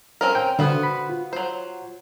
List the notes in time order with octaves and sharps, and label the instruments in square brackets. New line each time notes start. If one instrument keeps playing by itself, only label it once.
[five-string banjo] C4 C#4 A#4
[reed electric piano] G5
[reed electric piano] D3 [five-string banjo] B3 F#4 C5
[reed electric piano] B5
F4
[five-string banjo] F#3 C5